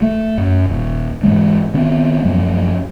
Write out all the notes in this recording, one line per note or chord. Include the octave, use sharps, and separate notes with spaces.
A3
F#2
D#1
G#2 E3 G#3
D#3 B3 C4
F#2 F3 F#3 A3